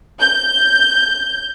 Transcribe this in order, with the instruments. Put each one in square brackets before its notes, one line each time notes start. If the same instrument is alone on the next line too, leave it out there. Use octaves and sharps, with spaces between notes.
[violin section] G6